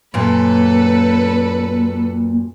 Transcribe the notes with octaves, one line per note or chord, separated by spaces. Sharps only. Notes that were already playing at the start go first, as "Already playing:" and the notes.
F#2 A#2 A#3 A4 B4